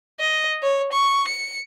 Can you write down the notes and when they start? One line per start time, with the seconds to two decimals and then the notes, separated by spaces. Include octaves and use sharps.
0.20 D#5
0.62 C#5
0.92 C#6
1.27 C#7